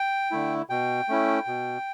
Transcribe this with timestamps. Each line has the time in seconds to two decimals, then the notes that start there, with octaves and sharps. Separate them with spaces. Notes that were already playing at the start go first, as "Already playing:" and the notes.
Already playing: G5
0.31 D3 A3 E4
0.69 B2 G5
1.09 A3 C#4 E4
1.47 B2